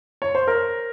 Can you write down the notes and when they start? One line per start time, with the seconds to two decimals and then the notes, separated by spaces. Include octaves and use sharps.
0.22 C#5
0.35 C5
0.47 A#4